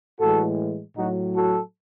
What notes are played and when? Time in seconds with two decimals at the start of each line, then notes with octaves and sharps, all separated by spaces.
0.19 A2 E3 G#3 F#4 A4
0.97 A2 F#3 D#4 F#4
1.35 F#4 A4